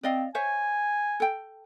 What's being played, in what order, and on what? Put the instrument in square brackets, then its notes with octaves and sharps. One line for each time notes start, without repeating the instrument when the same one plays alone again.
[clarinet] C4 [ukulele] D5 D#5 F5
[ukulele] C5 C#5 E5 [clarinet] G#5
[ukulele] A4 G5